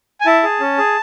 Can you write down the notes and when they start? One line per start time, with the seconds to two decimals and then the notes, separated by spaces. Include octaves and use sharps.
0.21 G#5
0.26 E4 A5
0.43 G#4
0.60 C#4
0.78 G#4